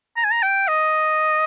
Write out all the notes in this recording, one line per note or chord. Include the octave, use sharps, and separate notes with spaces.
A#5
G#5
A#5
G5
D#5